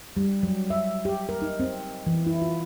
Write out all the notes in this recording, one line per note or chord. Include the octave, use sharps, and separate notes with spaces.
G3
F#3
E5
G4
A#4
D#4
C4
E3
E4
F4